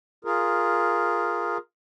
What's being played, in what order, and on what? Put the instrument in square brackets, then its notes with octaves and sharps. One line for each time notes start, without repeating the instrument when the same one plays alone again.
[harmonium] F4 G#4 A#4